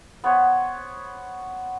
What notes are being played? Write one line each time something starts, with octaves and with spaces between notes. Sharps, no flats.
B3 C5 C#5